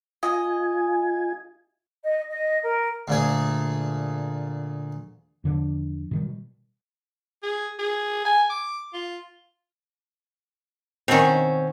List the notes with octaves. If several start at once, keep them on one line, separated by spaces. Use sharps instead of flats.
F4 D#5 G#5
D#5
D#5
A#4
D2 A#2 G#4
E2 D3 F3
B2 D#3 G3
G#4
G#4
G#5
D6
F4
B2 D#3 C4 C#4